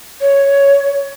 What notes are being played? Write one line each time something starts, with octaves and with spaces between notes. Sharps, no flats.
C#5